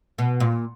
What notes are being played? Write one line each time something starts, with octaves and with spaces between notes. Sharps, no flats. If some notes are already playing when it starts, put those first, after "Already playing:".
B2
A#2